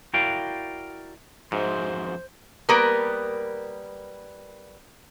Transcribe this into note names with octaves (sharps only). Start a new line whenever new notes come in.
E4 F#4 A#4 D5 F5 G5
F2 G#2 F#4 C5 E5
G3 A#3 B3 A#4 B4